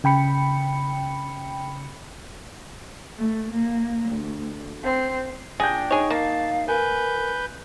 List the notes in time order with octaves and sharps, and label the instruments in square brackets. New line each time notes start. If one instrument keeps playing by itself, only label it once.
[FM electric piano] C#3 G5 B5 C#7
[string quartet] A3
A#3
D2
C4
[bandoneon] A#2 D4 [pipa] G#4 [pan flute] G5 [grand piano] G6 A#6
[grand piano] D#4 [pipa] G#4 C#5
[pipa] A#3 [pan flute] F5 [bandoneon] A5
[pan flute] A#4 [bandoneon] B4 G6 [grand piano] G#5